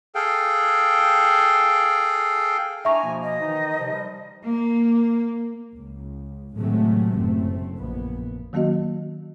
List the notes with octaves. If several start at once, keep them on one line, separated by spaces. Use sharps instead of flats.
G#4 A4 F5 G5
D4 E4 E5 G#5 A#5 C#6
B2 F3 A#3
D#5
D#3 E3 D#4
C3 F3
F3 G3
A#3
C#2
A2 C3 D#3 F#3 G#3 A3
F#1 A3 C4
A#1 B3
D#3 F#3 A#3 C#4 F#4 D#5